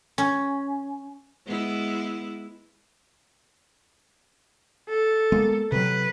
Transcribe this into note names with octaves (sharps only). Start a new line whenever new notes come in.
C#4
G#3 B3 E4
A4
G#3 A#3 B3
C3 F#3 B4